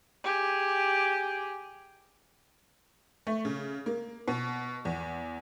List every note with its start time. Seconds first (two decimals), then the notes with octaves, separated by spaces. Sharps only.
0.24 G4 G#4
3.27 A3
3.45 C#3
3.86 A#3
4.28 B2
4.85 E2